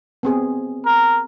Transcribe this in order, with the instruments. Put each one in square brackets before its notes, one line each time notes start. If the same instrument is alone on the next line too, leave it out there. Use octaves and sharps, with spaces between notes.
[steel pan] B3 C4 G#4
[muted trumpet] A#4